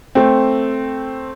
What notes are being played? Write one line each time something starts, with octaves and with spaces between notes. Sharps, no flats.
A3 C4